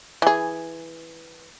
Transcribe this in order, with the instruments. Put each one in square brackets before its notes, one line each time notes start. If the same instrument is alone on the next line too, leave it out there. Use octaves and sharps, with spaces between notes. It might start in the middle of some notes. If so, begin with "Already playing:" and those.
[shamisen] E3 G#4